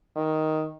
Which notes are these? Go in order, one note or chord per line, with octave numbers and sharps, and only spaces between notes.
D#3